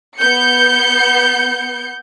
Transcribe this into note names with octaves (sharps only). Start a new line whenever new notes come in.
B3 G6 C#7